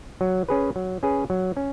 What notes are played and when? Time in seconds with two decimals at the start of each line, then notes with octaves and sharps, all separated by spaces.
0.21 F#3
0.49 C#4 G#4 B4
0.76 F#3
1.03 C#4 G#4 B4
1.30 F#3
1.57 C#4